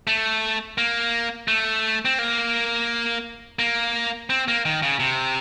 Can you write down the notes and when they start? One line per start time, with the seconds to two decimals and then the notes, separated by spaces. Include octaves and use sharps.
0.07 A3
0.78 A#3
1.48 A3
2.05 C4
2.19 A#3
3.59 A#3
4.30 C4
4.48 A#3
4.65 D#3
4.83 C#3
5.00 C3